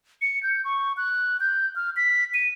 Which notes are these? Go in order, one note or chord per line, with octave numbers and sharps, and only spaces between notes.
C#7
G6
C#6
F#6
G6
F6
B6
D#7